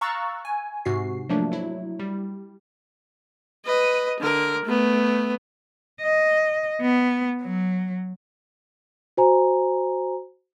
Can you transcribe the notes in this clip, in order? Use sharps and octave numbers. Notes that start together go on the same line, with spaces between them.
F5 A#5 C#6 E6 F#6 A6
G#5
G#2 C3 F#4 C7
F3 F#3 A3 A#3 D4
F#3 E4
G3
B4 D#5
D3 A#4
A3 B3
D#5
B3
F#3
F#4 C5 G#5 A#5